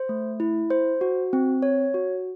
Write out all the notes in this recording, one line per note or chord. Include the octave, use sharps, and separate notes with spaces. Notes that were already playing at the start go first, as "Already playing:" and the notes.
Already playing: C5
A3
E4
C5
F#4
C4
C#5
F#4